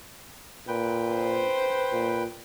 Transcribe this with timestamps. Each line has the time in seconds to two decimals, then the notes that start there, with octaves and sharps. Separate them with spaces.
0.68 A#2 B4 G5
1.16 C5
1.93 A#2